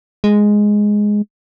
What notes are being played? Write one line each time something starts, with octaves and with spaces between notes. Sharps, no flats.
G#3